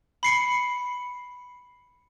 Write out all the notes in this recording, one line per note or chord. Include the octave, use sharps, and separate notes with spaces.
B5 C7 C#7